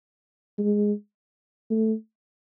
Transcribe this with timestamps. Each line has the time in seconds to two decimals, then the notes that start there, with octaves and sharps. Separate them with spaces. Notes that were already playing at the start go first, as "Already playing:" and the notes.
0.58 G#3
1.71 A3